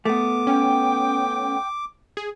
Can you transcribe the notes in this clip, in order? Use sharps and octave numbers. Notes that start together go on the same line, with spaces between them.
A3 B3 D6
C#4 G5
G#4